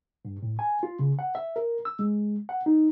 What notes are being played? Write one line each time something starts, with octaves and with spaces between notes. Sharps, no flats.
G2
A2
G#5
F4
C#3
F#5
E5
A#4
E6
G#3
F#5
D#4